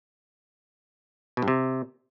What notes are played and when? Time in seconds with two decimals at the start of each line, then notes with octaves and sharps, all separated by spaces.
1.37 B2
1.42 G2
1.48 C3